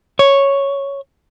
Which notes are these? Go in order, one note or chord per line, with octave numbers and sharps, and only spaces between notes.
C#5